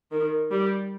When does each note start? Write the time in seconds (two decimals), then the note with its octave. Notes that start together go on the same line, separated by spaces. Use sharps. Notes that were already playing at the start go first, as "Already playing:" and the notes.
0.11 D#3
0.51 G3